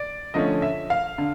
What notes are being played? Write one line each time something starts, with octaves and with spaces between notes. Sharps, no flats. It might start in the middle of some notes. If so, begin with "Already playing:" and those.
Already playing: D5
D3 F3 A3 C#4 D#5
E5
F5
D3